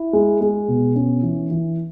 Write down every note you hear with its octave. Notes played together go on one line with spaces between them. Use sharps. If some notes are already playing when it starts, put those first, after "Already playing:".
Already playing: E4
G#3
G#3
B2
C#4
E3
E3